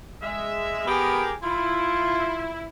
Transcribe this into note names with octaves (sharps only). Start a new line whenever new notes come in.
G#3 E5
B3 G4 G#4 A#4
E4 F4